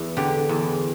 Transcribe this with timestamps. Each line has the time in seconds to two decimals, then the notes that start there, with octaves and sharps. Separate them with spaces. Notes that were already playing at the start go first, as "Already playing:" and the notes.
Already playing: E2
0.17 D3 G4
0.49 E2